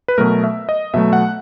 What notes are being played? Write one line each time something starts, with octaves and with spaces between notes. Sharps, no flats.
B4
B2 F#3 A3 A#4
E5
D#5
B2 F#3 A3 E5
F#5